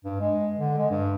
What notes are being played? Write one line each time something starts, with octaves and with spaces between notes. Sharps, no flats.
G2
G#3
D3
G#3
G2